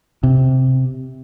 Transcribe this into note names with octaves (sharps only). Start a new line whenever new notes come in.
C3